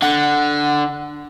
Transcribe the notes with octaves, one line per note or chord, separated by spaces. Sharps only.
D3 F#5